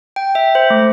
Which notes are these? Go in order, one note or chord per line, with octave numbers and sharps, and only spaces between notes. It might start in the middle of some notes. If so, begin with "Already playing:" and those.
G5
E5
C5
A3